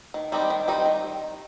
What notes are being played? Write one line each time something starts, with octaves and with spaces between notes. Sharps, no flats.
D#3
G3 C4 D#4 G4
D#3
G3 C4 D#4 G4
D#3